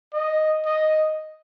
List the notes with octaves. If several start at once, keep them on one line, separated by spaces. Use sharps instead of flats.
D#5
D#5